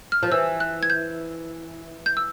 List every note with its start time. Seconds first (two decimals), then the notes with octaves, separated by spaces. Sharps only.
0.12 F6
0.23 F3
0.32 E3 E6
0.60 F#6
0.83 G#6
0.90 G6
2.06 G6
2.17 E6